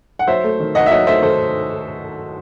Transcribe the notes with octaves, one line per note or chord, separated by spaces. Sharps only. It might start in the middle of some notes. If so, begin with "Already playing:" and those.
F#5
F#3 C5 E5
A3
D#3
D#2 D#5 F#5
E5
F#3 D#5 F#5
A3 C5 E5
D#3 A4 C5